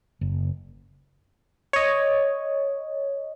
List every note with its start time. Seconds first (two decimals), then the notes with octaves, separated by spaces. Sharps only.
0.21 F#1
1.73 C#5 D#5